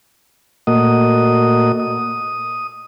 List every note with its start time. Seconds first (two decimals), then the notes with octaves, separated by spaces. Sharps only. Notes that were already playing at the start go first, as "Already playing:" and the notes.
0.67 A#2 A3 A#3 F#4 D#5 D#6
1.80 D#6